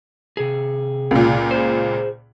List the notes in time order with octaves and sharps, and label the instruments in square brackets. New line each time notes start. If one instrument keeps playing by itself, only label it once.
[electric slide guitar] C3 G#4
[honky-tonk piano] C#2 A#2
[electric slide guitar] G#4 C5